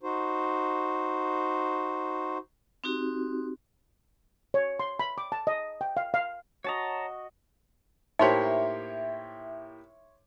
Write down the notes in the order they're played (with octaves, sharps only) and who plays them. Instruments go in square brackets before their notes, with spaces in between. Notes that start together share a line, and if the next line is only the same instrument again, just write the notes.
[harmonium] D#4 F#4 C5
[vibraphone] C4 D#4 F#4 G4
[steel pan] C#5
C6
B5
D6
A5
D#5
G5
F5
F5
[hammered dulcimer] F#4 D#5 [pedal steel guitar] C#5 A5 A#5
[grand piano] A2 A#3 G4 [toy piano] D#4 C5 [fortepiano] C#5 C6 [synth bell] E5